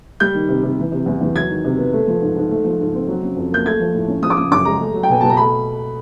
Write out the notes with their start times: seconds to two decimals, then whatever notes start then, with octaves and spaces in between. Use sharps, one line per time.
0.20 G3 G6
0.34 D#3
0.49 C3
0.63 C3
0.79 E3
0.92 C3
1.06 E2
1.21 E2
1.35 F#3 G#6
1.49 D#3
1.65 C3
1.78 B3
1.93 A3
2.07 F3
2.21 G#2
2.36 G#2
2.51 A3
2.64 F3
2.80 G#2
2.94 C4
3.07 F#3
3.22 C#3
3.37 F2
3.52 A#3 G6
3.66 A3 G#6
3.80 F3
3.94 A2
4.08 C#4
4.22 F3 D#6
4.30 D6
4.37 C#3 D#6
4.51 F#2 D6
4.65 G#3 A#5
4.80 A3
4.94 F#3
5.03 G5
5.09 B2 G#5
5.21 B2 A5
5.30 A#5
5.37 A3 B5